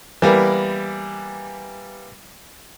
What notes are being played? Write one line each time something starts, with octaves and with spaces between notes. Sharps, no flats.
E3 G3 A#3 B3